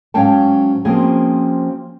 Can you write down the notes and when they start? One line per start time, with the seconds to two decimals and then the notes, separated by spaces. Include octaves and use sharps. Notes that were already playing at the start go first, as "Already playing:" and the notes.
0.14 G#2 F#3 C#4 F5 G5 A5
0.85 F3 A#3 C4 C#4 F#4 G#4